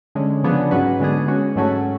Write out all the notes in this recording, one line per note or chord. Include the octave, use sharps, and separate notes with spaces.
D3 G#3 C#4
C#3 F3 B3 D4 G#4
G#2 F#3 C#4 F#4 B4
D3 G#3 B3 D4 G#4
G#3 C#4 F#4
G#2 F#3 A3 C#4 F#4